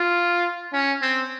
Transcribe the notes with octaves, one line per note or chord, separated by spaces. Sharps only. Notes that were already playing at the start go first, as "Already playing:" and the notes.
Already playing: F4
C#4
C4